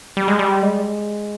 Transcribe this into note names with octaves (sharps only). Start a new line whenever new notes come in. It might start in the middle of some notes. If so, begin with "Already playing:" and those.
G3
G#3
G3
G#3